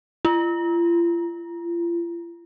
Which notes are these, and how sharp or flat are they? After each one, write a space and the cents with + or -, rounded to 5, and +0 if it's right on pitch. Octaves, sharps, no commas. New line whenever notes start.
F4 -40